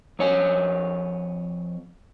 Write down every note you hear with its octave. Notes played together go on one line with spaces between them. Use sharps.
F2 C#5 G#5